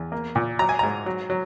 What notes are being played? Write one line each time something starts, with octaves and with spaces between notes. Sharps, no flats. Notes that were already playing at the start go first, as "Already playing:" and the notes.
Already playing: E2
A#3
A#2
F#3 A#5
G#5
G#2 A#5
F#3
F#3